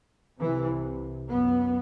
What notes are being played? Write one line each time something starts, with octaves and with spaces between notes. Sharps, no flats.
C2 C3 E3
F#2 B3